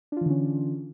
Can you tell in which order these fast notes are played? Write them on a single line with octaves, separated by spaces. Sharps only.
D4 F4 E3 D3 C#4